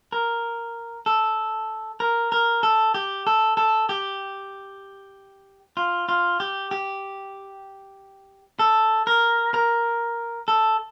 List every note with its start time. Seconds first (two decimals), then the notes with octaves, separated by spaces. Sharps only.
0.12 A#4
1.06 A4
2.00 A#4
2.32 A#4
2.63 A4
2.94 G4
3.27 A4
3.57 A4
3.89 G4
5.77 F4
6.09 F4
6.40 G4
6.71 G4
8.59 A4
9.07 A#4
9.54 A#4
10.48 A4